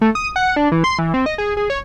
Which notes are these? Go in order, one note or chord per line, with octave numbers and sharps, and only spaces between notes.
A3
D#6
F#5
D4
E3
C6
E3
C4
D#5
G#4
G#4
C#5